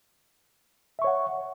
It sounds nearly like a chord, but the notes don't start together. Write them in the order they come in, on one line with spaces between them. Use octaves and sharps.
E5 C#6 C#5 F#5